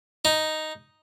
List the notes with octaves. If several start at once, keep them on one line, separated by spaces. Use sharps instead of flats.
D#4